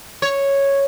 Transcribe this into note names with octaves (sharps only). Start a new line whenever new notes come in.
C#5